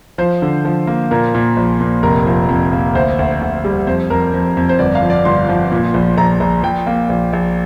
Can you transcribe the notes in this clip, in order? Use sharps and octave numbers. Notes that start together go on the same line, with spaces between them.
F3 C5
D3
F3
A#3
A#2 A#4
A#2
A#1
A#2
F1 A#4
F3
F2
A#3
D2 C5
D2
D2
G3
F2 C5
F2 A#4
F2
F2
C5
G1 D5
F5
F3
D5
G1 C6
F3
A#2
A#1
A#1 A#5
A#1
A#1 G5
A#3
A#1
A#1